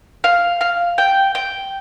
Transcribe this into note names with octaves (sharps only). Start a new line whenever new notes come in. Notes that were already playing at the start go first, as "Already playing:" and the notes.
F5
F5
G5
G5